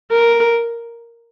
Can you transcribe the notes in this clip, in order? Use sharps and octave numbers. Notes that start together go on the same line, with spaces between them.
A#4